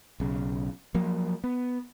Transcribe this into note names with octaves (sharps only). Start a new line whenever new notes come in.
B1 C#3
F3 F#3 A#3
B3